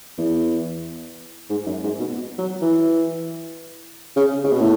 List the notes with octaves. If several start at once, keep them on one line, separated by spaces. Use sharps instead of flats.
E2
G#2
F#2
G#2
B2
F#3
E3
C#3
C#3
B2
A2